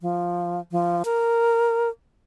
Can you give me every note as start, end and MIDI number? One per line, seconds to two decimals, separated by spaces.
0.01 0.60 53
0.72 1.03 53
1.05 1.89 70